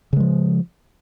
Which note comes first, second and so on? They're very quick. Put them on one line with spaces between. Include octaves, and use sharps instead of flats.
C#3 G#3 F3